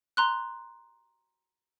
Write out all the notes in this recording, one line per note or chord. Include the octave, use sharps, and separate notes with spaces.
A#5 C6 F#6